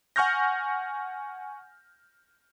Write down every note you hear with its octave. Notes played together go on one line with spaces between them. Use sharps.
F#5 G#5 C#6 F6 G6 A#6